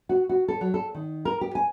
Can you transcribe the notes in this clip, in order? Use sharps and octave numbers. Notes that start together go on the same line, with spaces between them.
F#4
F#4
A4
F#3
A4
D#3
A#4
G4
G#5